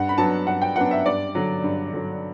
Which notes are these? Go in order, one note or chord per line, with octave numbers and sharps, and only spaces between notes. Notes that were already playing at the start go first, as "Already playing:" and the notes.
Already playing: G2 F#5
B5
F#3 B3 D4 A5
G2 F#5
G5
F#3 B3 D4 F#5
E5
G2 D5
D3 F#3
G2
D3 F#3